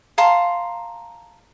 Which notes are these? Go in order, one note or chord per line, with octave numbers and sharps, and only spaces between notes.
F5 A5 A#5 C6